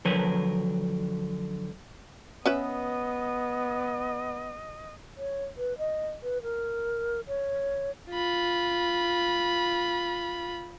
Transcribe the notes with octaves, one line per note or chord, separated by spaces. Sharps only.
D3 F3 F#3 A#4 B4 C#5
B3 C#4 B4 D#5 E5
C#5
B4
D#5
B4
A#4
C#5
F4 B5